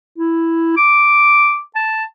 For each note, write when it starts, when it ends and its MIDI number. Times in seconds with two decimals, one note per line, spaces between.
0.18 0.72 64
0.77 1.60 86
1.75 2.04 81